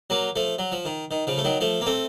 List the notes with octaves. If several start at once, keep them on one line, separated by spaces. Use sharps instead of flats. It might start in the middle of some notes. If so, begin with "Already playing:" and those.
F#3 A#3
F3 A3
F#3
F3
D#3
D#3
C#3 F3
A3
D#3 F#3
F3 A3
A#3
A3 C4